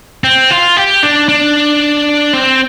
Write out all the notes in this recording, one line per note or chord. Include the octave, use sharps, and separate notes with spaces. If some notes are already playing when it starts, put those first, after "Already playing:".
C4
F4
G4
D4
D4
C4